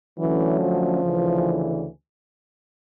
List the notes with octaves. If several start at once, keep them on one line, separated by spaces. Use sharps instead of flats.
D3 E3 F#3 A3 C#4
F3
D2 C#3 E3